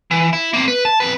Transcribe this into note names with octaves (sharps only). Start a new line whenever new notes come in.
E3
E4
A#3 C4
B4
A5
F2 B4